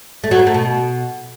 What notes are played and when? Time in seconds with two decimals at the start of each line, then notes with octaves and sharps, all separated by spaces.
0.24 A3
0.31 F#3
0.39 A#3
0.47 A3
0.54 B2